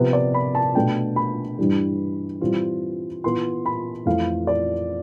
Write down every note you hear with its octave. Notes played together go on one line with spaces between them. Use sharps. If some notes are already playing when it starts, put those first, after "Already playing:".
Already playing: C3 F3 B3 B4
D5
B5
A5
B2 A3 D4 G5
B5
G2 E3 G3
E3 G3 C4 F4
E3 B3 F4 C6
B5
F2 E3 A3 F5
D5